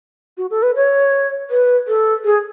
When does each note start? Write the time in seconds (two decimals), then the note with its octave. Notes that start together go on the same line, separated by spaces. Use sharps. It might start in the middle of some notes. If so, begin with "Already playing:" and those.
0.38 F#4
0.51 A4
0.63 B4
0.76 C#5
1.50 B4
1.88 A4
2.24 G#4